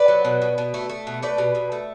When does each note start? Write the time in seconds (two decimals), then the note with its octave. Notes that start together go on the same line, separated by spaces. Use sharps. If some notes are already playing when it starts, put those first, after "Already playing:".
Already playing: B4 D5
0.08 F#3
0.25 B2
0.42 B2
0.58 B2
0.74 A3
0.89 A3
1.07 B2
1.22 A3 B4 D5
1.38 B2
1.55 B2
1.72 A3